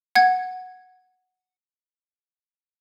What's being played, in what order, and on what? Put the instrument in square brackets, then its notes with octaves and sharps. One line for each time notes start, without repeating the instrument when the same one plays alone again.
[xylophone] F#5 G#6